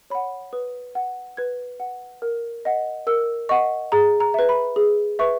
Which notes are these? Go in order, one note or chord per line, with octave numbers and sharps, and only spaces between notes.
C#5 F#5 B5
B4 D#6
F#5
B4 G#6
F#5
A#4
D#5 F#5
A#4 E6
D#5 F#5 C#6
G#4 A#5
A#5
B4 E5
B5
G#4
B4 E5 C#6